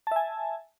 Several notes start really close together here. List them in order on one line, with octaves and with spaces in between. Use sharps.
A5 E5 G#5